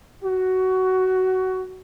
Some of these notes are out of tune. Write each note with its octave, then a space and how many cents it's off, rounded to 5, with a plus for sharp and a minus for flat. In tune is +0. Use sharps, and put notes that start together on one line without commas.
F#4 +15